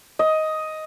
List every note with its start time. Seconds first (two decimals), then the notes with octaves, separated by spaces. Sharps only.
0.19 D#5